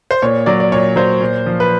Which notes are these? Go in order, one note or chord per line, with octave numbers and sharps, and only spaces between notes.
C5
A#2 C#5
F#3 D5
D5
A#2 C#5
F#3 C5
A#2
F3
B4